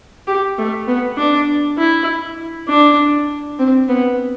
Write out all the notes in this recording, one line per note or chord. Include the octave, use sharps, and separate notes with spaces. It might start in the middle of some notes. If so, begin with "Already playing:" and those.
G4
A3
B3
D4
E4
D4
C4
B3